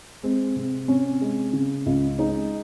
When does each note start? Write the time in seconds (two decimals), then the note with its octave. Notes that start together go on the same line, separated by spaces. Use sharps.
0.23 G#3 C4
0.56 C3
0.88 C3 C#4
1.21 G#3
1.53 C#3
1.86 C#2
2.19 G#3 D#4